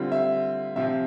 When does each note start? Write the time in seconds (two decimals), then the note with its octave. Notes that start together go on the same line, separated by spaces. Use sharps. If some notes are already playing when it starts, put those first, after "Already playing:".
Already playing: D3 G3 C4 F4
0.12 E5
0.76 C3 F3 C4 F4 E5